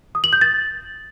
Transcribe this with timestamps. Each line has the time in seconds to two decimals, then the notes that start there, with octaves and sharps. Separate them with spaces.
0.15 D#6
0.24 F#7
0.33 G6
0.41 A6